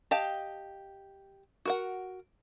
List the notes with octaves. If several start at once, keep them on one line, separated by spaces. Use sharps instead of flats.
G4 D#5 F5 G5 A5
F#4 A#4 F#5